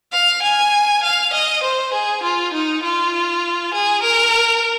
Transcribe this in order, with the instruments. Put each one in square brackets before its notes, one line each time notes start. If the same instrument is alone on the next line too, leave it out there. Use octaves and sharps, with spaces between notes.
[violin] F5
G#5
F5
D#5
C5
G#4
F4
D#4
F4
G#4
A#4